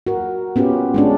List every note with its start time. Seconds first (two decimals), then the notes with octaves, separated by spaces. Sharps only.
0.07 F#4 A#4
0.56 B3 C#4 F4 G4
0.94 G#3 C#4 D4